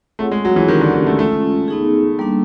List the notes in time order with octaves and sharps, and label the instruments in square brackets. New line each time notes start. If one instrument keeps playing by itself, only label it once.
[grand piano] A3 [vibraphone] C4 F4 G#4 C#5 F#5
[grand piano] G#3
F#3
E3
[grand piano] D#3 [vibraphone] A#3 C#4 E4 G4
[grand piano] D3
D#3
A3
[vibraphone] G#3 C#4 F4 [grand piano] A3
[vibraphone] B3 D#4 G#4
G3 A#3 D4